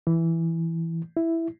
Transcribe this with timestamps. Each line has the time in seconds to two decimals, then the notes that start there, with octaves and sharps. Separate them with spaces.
0.07 E3
1.17 E4